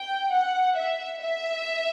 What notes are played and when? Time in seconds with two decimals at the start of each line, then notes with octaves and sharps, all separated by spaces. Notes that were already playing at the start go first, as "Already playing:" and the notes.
Already playing: G5
0.33 F#5
0.78 E5
1.22 E5